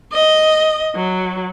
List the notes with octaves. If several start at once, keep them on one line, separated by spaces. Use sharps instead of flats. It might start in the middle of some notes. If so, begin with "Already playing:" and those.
D#5
F#3